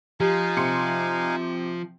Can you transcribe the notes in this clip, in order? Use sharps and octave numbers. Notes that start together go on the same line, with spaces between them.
F3 D#4 G4 F5 G#5
C3 C6 C#7